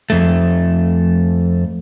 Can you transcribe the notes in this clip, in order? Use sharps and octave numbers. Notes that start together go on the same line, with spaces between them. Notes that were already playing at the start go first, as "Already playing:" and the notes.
F2 A3